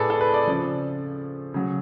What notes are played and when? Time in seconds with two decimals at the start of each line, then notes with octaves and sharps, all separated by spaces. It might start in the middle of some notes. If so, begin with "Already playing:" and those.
Already playing: A2 G#4 A4 B4 D5
0.10 A4
0.21 B4
0.34 D5
0.47 C#3 F3
1.54 C#3 F#3